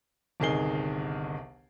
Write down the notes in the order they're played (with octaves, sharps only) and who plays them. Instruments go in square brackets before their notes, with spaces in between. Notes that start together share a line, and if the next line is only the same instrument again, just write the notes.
[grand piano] G1 C2 D#3 G#4 C7 G7